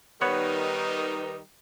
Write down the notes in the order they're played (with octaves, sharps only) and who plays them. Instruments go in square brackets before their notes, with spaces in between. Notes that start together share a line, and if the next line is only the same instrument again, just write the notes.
[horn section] D#3 G3 D#4 [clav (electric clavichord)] B3 C#5 F#5 [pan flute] B4